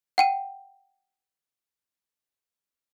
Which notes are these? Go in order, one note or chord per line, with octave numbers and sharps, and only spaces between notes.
F#5 G5 D#7